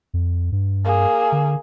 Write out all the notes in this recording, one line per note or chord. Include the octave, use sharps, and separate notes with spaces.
F2
G2
A#3 G#4
D3